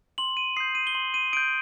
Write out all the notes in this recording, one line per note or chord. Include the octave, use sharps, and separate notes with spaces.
C6 F#7
D#7
D#6 G6 C7
D#7
G7
C6 F#7
D#7
D#6 G6 D7